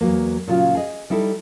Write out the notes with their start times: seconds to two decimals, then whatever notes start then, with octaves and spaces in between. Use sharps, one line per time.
0.01 E2 G2 F#3 A#3
0.47 A#2 C#3 F#3 F4
0.75 G#4 D#5
1.10 G3 D#4 E4 A4